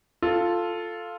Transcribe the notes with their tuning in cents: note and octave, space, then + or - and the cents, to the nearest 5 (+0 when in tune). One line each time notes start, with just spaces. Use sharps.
F4 +0 A4 +0